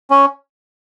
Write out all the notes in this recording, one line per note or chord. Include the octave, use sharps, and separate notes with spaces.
C#4